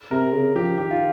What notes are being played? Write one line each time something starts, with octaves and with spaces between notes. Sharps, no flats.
C3 A#4
C#3
F3 G4
D#3 G4
F4